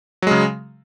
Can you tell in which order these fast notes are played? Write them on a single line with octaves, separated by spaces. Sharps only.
F#3 G#3 C#3